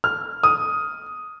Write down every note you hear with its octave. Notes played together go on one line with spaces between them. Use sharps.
F6
D#6